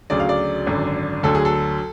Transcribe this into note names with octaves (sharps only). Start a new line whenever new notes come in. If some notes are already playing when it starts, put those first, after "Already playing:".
D2 C#3 F#3 D5
F5
D5
G#1 F#2 D3
D2 D3 F#3 A4
G#4
A4